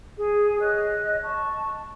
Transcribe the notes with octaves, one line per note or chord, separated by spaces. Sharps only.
G#4
C#5 D#5 F#6
A5 C#6